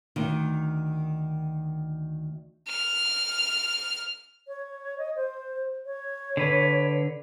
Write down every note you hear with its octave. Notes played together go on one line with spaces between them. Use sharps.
D2 D#3
F6
C#5
D#5
C5
C#5
D3 B4